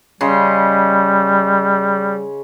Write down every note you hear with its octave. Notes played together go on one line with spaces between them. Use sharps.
C#3 G3 D#5 C6